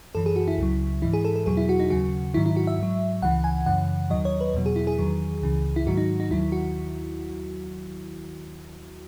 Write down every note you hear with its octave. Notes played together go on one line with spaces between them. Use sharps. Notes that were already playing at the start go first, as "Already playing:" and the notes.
F#2 E3 A4
G#4
F#4
E4
C#2 C#3 F#3
G#2 E3 E4
G#4
A4
A4
E2 B2 F#3 G#4
E4
F#4
D#4
D#2 C#3 F#3 F#4
G#2 D#3 F#3 E4
E4
F#4
E5
G#2 F#3
C#2 C#3 E3 F#5
G#5
F#2 C#3 E3 F#5
D#2 D#3 F#3 D#5
C#5
B4
E2 B2 F#3
G#4
E4
G#4
E2 D#3 F#3
C#2 C#3 E3
E4
G#2 D#3 F#3 F#4
D#4
D#4
D#2 D#3 F#3 E4
F#4